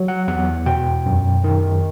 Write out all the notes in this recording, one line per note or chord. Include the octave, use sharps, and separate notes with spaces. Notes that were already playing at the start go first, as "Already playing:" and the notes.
Already playing: F#3
F#5
E2 F#5
B2 G5
F#2
D#3